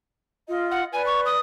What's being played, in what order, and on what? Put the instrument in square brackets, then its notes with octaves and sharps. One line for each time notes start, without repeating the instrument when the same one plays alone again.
[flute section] F4 D#5
[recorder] F#5
[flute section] B4 D5 [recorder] G#5
[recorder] C#6
D#6